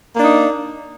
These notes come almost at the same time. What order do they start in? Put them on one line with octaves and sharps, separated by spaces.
A#3 D4 D#4